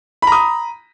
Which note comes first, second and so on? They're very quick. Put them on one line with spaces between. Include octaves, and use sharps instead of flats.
B5 A#5 D#6